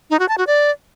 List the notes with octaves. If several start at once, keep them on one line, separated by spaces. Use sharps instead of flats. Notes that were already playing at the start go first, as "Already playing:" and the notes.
D#4
F#4
A5
F#4
D5